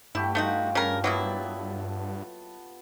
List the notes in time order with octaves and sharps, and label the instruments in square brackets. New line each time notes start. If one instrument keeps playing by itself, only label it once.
[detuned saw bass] G2 [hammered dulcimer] A3 G4 F#5 [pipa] E4
[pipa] A3 D#4 F#4 [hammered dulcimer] F4
[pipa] C#3 A#4
[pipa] F#3 A#3 E4 [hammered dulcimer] B3 A5